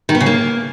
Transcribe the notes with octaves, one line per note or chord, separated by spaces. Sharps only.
D#3
B3
C#3
A#3